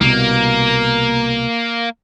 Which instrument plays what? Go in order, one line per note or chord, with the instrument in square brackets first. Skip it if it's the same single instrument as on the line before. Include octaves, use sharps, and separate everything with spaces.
[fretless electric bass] C2 B2 [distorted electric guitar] A#3